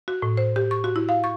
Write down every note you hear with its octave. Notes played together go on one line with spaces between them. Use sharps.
F#4
A2
C5
G4
C#6
F#4
E4
F5
C#6